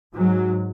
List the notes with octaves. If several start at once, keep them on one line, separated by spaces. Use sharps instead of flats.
G#2 F#3